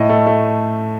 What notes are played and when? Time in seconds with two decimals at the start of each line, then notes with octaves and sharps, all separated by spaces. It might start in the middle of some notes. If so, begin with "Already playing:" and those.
Already playing: A2 D#5
0.09 A3
0.27 A3